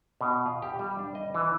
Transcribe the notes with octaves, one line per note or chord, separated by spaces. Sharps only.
B2
F4
G4
G3
D4
D#5
E3